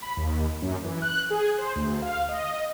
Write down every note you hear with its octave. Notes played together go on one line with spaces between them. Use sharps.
B5
D#2
F#2
E3
F#6
G#4
C5
D2
F5
D#5